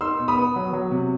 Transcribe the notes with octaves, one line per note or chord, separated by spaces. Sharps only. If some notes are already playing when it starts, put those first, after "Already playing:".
D#4 C6 E6
B2
B5 D#6
B3
F#3
F#3
C3